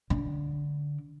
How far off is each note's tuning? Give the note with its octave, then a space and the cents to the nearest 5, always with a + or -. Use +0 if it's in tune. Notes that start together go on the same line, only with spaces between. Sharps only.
D3 -10